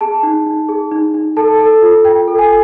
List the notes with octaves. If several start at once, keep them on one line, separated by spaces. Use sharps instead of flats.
G#4 A5
D#4
D#4
G#4
D#4
D#4
A4 A5
A4
F4
F4 G5
A4
G#5